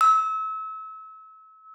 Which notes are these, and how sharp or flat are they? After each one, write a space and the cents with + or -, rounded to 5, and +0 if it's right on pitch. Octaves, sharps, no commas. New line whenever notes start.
E6 -30